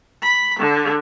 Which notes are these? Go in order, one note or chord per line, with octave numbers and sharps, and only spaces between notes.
B5
D3